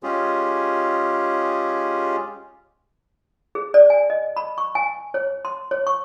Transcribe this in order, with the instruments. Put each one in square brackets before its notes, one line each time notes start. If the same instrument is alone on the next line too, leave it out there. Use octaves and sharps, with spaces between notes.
[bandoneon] G#3 C#4 F4 G4 G#4
[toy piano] G#4
D5
G#5
D#5
B5
C#6
G#5
C#5
C6
C#5
C#6